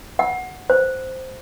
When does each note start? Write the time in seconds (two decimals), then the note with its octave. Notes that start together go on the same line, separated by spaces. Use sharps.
0.19 F#5
0.70 C5